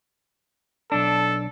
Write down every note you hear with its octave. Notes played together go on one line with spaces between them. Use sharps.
B1 D4 A4